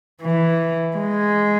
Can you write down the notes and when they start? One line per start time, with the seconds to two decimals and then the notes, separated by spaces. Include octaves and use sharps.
0.22 E3
0.97 G#3